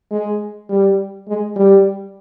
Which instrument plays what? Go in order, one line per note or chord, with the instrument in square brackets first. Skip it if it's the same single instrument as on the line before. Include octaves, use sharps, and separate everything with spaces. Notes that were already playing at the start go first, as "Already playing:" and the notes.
[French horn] G#3
G3
G#3
G3